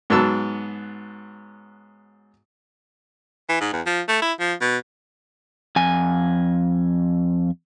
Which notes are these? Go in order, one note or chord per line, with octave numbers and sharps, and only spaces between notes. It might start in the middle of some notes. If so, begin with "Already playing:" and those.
G#2 F#3 B3 A5 E6
E3
G#2
E2
F3
A3
E4
F3
B2
F2 G#5